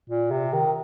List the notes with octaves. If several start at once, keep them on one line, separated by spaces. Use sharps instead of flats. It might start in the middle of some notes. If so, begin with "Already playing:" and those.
A#2
C3
D#3